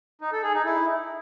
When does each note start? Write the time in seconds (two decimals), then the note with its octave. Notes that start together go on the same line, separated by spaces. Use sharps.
0.21 D#4
0.32 A4
0.43 G#4
0.54 D#4
0.65 E4